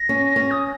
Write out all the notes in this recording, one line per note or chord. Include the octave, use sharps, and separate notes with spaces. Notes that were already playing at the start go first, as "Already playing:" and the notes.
Already playing: A#6
C#4
C#4
D#6